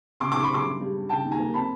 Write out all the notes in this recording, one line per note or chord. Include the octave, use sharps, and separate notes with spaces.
C#3 C6 D6
C#3 C6 D6
B5 C#6
C#3 C6 D6
G2
G3
G2
C#3 G5 A5
D#2
G#5 A#5
A#3
C4 A5 B5